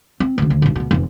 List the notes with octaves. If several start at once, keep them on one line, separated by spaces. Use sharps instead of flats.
C4
D2 C#3
D2
B1 G2
C#2 B2
F1 E2